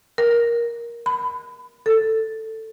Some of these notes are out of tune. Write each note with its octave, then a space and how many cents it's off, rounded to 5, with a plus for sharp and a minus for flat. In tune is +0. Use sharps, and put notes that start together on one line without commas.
A#4 +10
B5 +30
A4 +15